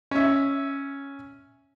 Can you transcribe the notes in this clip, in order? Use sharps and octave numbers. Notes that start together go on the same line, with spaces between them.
C#4 E5